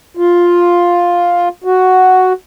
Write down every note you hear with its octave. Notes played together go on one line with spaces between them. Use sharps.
F4
F#4